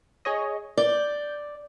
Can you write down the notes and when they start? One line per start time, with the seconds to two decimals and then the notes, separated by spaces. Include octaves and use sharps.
0.25 G#4 C#5 D#5
0.78 D5 G6